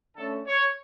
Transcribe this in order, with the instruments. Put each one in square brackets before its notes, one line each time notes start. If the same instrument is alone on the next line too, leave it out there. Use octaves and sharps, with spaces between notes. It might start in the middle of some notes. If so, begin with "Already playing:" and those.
[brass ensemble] D3 A3 C#4 A4
C#5